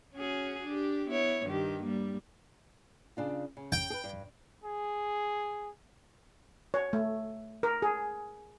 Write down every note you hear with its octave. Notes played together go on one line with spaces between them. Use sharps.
C#4 F#4 G#4
D4 G4
B3 E4 C#5
G2 D#3 G4
G3 A#3
C#3 D4 F4
C#3
G5
G#4 B4
G2
G#4
C#5
A3
A#4
G#4